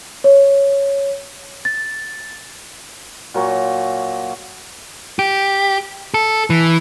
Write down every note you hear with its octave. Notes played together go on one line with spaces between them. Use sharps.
C#5
A6
A#2 F#3 A#5 C#6
G4
A4
E3